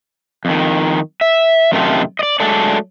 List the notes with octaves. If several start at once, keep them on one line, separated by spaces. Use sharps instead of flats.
F2 D#3
E5
F#2 C3 D#3 A3 F4 A4
D5 D#5
F#3 G#3 A3 D4 A4 D5